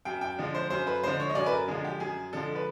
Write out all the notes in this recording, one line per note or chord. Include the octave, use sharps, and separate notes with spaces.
F#2 G5
G5
D3 F3 G#3
C5
F#2 C5
B4
D3 F3 G#3 C5
C#5
D#5
F#2 D5
B4
A#4
D3 F3 G#3 G#4
G4
F#2 G#4
D3 F3 G#3 A4
B4